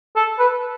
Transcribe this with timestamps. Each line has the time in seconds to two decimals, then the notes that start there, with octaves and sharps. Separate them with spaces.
0.16 A4
0.39 B4